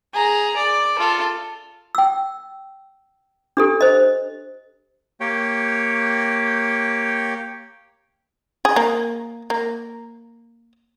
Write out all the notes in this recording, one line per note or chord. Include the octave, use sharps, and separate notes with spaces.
G#4 A#5
D5
F4 A4
G5 E6
D4 G4 A4
C5 D#5
A#3 G4 C#5 G5
G#4
A#3
A#3